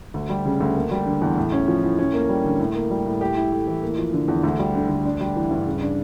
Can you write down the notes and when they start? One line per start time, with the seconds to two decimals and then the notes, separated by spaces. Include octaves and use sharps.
0.14 D2
0.29 G3
0.45 C#3
0.60 D2
0.76 A#3
0.91 G3
1.06 D3
1.22 E2
1.37 A2
1.52 C#4
1.68 F3
1.83 A2
1.99 C#4
2.14 A#3
2.29 G3
2.45 D3
2.59 A2
2.75 A#3
2.90 G3
3.06 A2
3.21 G4
3.37 E4
3.52 A3
3.68 E3
3.83 A#3
3.98 F3
4.13 D3
4.28 E2
4.43 D2
4.59 G3
4.74 D3
4.90 D2
5.05 D4
5.20 G3
5.36 E3
5.51 G2
5.66 C#3
5.82 D4